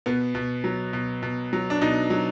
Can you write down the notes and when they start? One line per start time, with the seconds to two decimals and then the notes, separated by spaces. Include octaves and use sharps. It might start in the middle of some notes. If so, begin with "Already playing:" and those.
0.06 B2 B3
0.35 B2
0.64 F#3
0.93 B2
1.23 B2
1.53 F#3
1.70 D4
1.81 B2 D#4
2.10 F#3